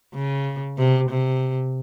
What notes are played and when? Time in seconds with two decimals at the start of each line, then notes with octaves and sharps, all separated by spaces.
0.14 C#3
0.78 C3
1.09 C3